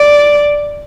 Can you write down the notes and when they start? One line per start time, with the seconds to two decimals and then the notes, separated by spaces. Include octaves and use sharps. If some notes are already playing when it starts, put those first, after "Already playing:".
Already playing: D5